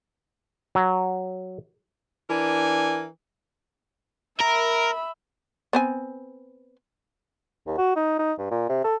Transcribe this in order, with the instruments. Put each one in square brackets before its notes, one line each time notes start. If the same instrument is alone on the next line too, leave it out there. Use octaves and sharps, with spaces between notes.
[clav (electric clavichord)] F#3
[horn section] E3 D4 A#4 G#5
[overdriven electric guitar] A#4 [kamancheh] E5 B5
[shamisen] B3 C4 G#5
[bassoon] D#2
F#4
D#4
D#4
G2
A#2
C3
A4